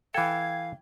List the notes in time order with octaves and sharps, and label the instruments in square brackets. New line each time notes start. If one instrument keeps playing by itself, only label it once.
[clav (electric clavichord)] E3 A4 [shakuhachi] F5 [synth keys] G5 G#6